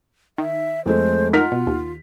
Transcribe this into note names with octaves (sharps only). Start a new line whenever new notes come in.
D#3 E5
F2 G#3 A3 C5
D#4 F4 A#4 F#5 F6 B6
B2
D#2